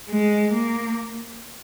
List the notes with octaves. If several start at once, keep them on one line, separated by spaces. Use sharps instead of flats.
G#3
A#3